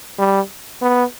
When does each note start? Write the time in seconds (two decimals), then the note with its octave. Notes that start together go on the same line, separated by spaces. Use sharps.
0.19 G3
0.82 B3